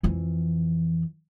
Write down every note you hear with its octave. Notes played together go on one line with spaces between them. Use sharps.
F2 E3